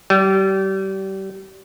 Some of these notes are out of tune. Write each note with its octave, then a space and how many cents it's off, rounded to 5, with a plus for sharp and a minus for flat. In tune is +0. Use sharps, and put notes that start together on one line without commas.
G3 -30